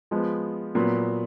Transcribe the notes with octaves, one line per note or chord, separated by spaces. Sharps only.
F3 G#3 B3
A#2 F#3 B3